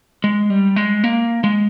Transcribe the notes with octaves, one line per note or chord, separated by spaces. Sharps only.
G#3
G3
G#3
A#3
G#3